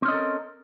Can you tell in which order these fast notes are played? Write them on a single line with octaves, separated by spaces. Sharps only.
C4 C#4 D#5 A4 A#4